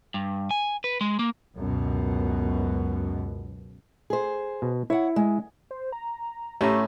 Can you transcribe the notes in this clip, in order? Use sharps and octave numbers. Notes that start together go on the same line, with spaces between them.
G2
G#5
B4
G#3
A#3
C#2 F#2 B2
G#4 C5
B2
E4 C#5 F#5
G#3
C5
A#5
A2 A3 C#4 G4 E5 A#5